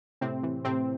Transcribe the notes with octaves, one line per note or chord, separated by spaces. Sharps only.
A2 C3 C4
E3
A2 C3 C4